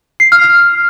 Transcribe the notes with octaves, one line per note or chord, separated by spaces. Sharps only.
C7
F6
F6